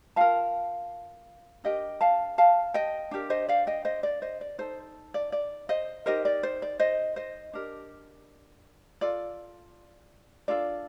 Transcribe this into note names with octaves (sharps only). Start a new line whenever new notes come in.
F4 A#4 F5 A5
D4 G4 A#4 D#5 G5
F5 A5
F5 A5
D#5 G5
D4 G4 A#4
C5 D#5
D5 F5
D#5 G5
C5 D#5
D5
C5 D#5
D5
D#4 A4 C5
D5
D5
C5 D#5
D#4 G4 A#4 C5 D#5
D5
C5
D5
C5 D#5
C5 D#5
D4 G4 A#4
F4 A4 D5
D4 F4 A4 D5